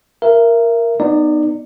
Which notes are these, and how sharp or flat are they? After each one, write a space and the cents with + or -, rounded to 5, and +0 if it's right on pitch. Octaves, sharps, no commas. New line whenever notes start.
A#4 +0 E5 +30
B3 +0 D#4 -30 D5 +0